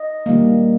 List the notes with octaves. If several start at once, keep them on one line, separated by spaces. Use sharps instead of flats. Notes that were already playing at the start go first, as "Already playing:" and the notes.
Already playing: D#5
D#3 G3 A#3